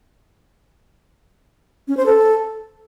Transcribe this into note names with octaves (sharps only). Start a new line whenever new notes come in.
C#4
C5
A4